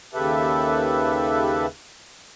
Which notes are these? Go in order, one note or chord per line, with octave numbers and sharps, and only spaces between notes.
D#2 C#3 G4 A4 B4 E5